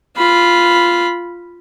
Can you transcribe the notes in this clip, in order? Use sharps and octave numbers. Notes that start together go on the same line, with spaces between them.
F4 B5